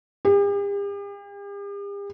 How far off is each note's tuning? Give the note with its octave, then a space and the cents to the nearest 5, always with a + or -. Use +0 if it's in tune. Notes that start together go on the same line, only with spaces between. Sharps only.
G4 +45